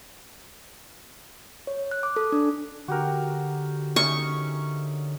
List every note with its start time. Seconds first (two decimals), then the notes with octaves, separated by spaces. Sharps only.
1.67 C#5
1.91 F#6
2.03 D6
2.16 A4
2.32 D4
2.88 D3 F#4 G4 A#4
3.96 C#4 D#4 E5 C#6